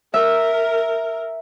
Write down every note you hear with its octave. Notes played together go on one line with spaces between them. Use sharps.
A#4 E5